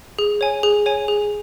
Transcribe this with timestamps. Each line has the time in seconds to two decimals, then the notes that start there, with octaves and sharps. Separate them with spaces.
0.19 G#4
0.41 C#5 G#5
0.63 G#4
0.86 C#5 G#5
1.08 G#4